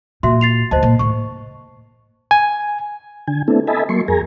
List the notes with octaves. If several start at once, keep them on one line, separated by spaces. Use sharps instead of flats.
A#2 F#4 E5 C6
A6 C7 F7
D2 C5 D#5 A5
A#2
A2 D#3 C#6
G#5
D3 G#5
A3 B3 C4 D4 E4 A4
A4 D#5 E5 G#5 A5 B5
F#3 A#3 C6 C#6
F2 G#4 A#4 G#5 A#5